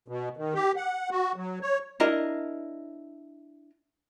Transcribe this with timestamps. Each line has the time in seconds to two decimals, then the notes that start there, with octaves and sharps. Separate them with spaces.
0.08 B2
0.37 D#3
0.54 G4
0.76 F#5
1.11 F#4
1.36 F#3
1.62 C#5
2.00 D4 E4 A#4 D#5